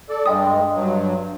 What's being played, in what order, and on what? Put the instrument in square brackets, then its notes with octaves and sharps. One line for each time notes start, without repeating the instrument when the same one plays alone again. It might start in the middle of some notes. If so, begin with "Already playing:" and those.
[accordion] A4 D5
[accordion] G2 G#3 [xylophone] D#5 G5 D#6
[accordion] G2 F#3